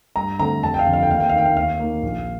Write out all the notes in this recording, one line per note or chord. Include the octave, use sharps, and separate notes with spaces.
G2 A#5
D3 A3 C4 A#5
F1 A5
G5
F5
F2 D3
F5
G5
D#2 F5
G5
F5
D#3 A#3 G5
F5
D#2 F5
D#3 A#3
A#1